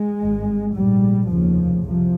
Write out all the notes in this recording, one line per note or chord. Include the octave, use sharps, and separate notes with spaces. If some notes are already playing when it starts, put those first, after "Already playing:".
Already playing: G#3
G#1 G2
A#1 G#2 G3
F1 D#2 C#3 F3
C2 C3 F3